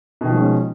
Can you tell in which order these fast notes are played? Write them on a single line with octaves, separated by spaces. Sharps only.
B2 D#3 F3 G#3 C#4